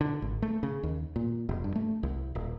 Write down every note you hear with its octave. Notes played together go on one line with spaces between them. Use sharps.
D3
G#1
A3
C#3
D#2
A#2
F1
G2
A3
C2
D#1